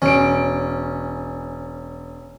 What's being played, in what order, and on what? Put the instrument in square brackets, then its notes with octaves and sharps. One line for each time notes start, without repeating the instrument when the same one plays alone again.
[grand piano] E1 D7 [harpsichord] C#4